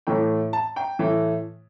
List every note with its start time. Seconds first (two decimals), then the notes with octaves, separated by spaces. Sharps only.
0.07 A2 E3 A3 G5
0.53 A5
0.76 G5
0.99 A2 E3 A3